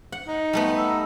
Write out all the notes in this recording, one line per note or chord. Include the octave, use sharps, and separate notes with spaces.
F#5
D#4
G3 A3 B3
F#5 A#5 E6